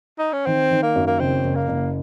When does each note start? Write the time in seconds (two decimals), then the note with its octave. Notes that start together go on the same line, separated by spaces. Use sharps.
0.19 D#4
0.33 C#4
0.46 D#3 C4
0.71 D#3
0.82 A#3
0.96 F#2
1.07 A#3
1.19 F#1 C4
1.44 F#1
1.56 A#3
1.68 F#1